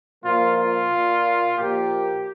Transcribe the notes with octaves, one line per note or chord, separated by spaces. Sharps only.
A#2 F3 A#3 F4
F4
A#2 A#3
A#2 F3 A#3 G4